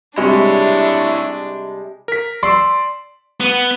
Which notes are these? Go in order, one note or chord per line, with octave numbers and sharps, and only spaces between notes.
C3 G3 G#3 D4 E4 C#5
A#4 B6
D5 C6 E6
B3